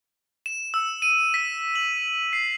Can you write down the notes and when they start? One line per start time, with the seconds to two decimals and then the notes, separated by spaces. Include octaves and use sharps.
0.46 E7
0.74 E6
1.02 D#7
1.34 B6
1.76 F#7
2.33 C7